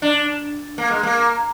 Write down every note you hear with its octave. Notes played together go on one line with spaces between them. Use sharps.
D4
A#3
G#3
A#3